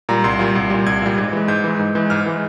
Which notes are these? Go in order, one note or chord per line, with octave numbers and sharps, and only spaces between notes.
A#2 G3 A#5
C2 C6
A#2 G3
C2
A#2 G3
C2 G#6
A#2 G3
G#2
E3 G#3
G#2 G6
E3 G#3
G#2
E3 G#3
G#2 F6
E3 G#3